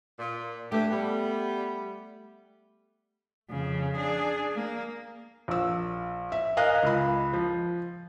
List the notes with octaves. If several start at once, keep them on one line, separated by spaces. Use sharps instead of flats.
A#2
E3 A3 D4 G4
G3 B3
F2 C#3
D4 G#4
A#3
A#1 E6
E5
A#4 D#5 F5 G#5 F#6
C#2 B5
F3